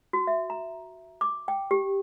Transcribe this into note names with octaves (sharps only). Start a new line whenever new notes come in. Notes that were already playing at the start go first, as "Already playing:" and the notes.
F#4
E5
A#5
D6
G5
G4